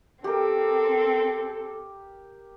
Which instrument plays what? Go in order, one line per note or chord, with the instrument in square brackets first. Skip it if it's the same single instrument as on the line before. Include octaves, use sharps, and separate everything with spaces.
[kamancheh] C4 A4 [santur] G4 A#4